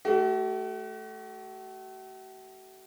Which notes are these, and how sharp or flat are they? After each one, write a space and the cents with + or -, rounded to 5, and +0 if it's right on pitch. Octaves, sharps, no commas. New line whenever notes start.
A3 -10 F#4 +45